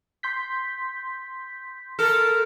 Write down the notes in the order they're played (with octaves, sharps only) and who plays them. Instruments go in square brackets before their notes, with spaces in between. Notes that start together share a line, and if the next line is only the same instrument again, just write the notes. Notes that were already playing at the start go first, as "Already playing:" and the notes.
[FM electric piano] C6 G6 B6
[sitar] A4 [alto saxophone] A#4